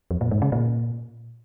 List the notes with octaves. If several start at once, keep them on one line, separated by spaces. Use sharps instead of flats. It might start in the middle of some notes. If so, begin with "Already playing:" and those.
F2
A#2
G#2
C#3
A#2